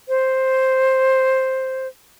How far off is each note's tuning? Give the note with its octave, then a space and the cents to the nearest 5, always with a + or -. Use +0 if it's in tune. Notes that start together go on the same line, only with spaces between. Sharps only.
C5 +5